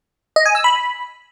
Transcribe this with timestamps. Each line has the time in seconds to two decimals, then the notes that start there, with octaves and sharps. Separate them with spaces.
0.36 D#5
0.46 G#5
0.55 E6
0.64 B5